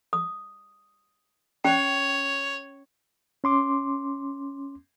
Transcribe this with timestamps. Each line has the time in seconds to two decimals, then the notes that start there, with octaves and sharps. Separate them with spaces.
0.13 D#6
1.64 C#4 C#5 G5
3.44 C#4 C6 D6